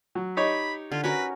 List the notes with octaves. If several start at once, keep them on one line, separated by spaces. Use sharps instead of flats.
F#3
D#4 G4 C#5 B5
D3 F4
C#4 F#4 A#4 B4